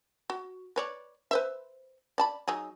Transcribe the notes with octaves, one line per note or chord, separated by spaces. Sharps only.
F#4
B4 C#5 D5
B4 C5 E5
D5 A5 B5
F#3 D#4 G#4